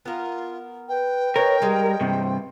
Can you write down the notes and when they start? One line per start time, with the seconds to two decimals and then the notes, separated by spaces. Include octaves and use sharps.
0.06 B3 F4 A#4
0.89 B4 G5
1.36 D#4 A#4 B4 C#5
1.62 G3 G#3 D#4
2.01 G2 C3 C4